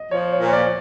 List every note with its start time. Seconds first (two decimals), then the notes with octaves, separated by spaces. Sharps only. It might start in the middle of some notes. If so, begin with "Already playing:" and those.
Already playing: D#5
0.11 F3 C#5
0.32 C#5
0.40 A#2
0.47 C#5
0.53 D5